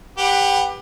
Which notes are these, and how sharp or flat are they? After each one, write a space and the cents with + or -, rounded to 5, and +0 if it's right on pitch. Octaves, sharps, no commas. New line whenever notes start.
G4 +20 B4 +0 F#5 +0